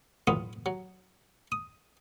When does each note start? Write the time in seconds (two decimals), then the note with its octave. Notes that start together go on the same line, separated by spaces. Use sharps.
0.27 B1 E2 A2 B3 F4 D#6
0.66 F#3
1.52 D#6